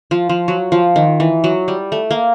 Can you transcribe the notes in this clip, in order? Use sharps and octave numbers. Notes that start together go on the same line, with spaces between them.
F3
F3
F#3
F3
D#3
E3
F#3
G3
A3
A#3